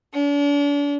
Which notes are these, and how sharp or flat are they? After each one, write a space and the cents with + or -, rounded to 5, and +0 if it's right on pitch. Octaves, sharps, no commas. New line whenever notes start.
D4 -40